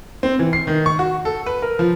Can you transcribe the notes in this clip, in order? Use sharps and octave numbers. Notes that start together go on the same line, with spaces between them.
C4
E3
C7
D#3
C#6
F#4
A4
B4
A#4
F3